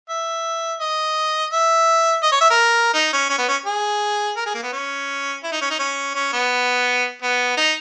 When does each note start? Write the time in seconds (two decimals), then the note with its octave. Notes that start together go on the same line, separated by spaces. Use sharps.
0.09 E5
0.80 D#5
1.52 E5
2.23 D#5
2.32 C#5
2.41 E5
2.50 A#4
2.94 D#4
3.13 C#4
3.30 C#4
3.38 B3
3.48 C#4
3.66 G#4
4.37 A#4
4.46 G#4
4.55 A#3
4.63 B3
4.73 C#4
5.44 E4
5.52 D#4
5.62 C#4
5.71 D#4
5.79 C#4
6.15 C#4
6.33 B3
7.22 B3
7.57 D#4